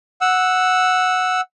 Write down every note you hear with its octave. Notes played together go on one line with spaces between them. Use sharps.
F#5 E6